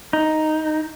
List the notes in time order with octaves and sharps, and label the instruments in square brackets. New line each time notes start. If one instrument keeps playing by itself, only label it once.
[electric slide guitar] D#4